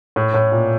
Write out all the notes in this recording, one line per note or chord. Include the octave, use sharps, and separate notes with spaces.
A2
A2
A#2